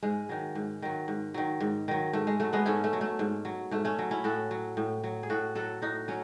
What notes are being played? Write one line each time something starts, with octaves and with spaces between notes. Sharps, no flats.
G#2 G#3
D#3 F#3
G#2
D#3 F#3
G#2
D#3 F#3
G#2
D#3 F#3
G#2 A3
G#3
F#3 A3
G#3 B3
G#2 A3 C#4
A3
F#3
A3
G#2
F#3
G#2 A3
A3 C#4
F#3
C#4 E4
A2 F#4 A4
F#3
A2
F#3
G#4
A2 F#4 A4
F#3 F#4 A4
A2 D#4 F#4
F#3 C#4